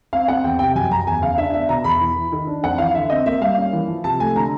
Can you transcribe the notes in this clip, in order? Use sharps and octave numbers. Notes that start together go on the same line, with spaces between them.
C4 F5
C4 F#5
E2 G5
C3 G5
F#2 G#5
F#2 A#5
E2 G#5
C#3 F5
D4 E5
B3 E5
B2 A#5
E2 B5
E3
E3
D#3
D4
F2 F#5
E3 F5
D3 E5
C4 D#5
A#3 E5
G3 F5
C#4
E3
F3
C3 A5
A3 G#5
D3 A#5